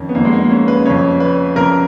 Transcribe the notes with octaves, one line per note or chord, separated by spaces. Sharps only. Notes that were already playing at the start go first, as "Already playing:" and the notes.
Already playing: F2 D#3 C#4
B3
F2 D#3 A#3
G#3
A#3
C#4
B4
F2 C#3 C#5
B4
F2 C#3 A#4